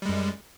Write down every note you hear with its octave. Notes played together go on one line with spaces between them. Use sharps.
F#2 G3 G#3